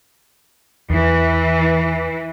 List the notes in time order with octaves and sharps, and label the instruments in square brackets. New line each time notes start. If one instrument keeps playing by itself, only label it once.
[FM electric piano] E2 [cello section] E3